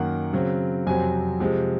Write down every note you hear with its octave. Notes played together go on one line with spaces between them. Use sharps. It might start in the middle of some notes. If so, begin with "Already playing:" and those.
Already playing: F#2 D#3 A#3 F#5
C#3 F#3 C4
F2 C3 F#3 C4 G#5
C3 F3 G#3